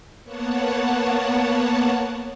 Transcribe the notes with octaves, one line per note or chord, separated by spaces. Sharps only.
A#3 B3 C#5 F#5 A5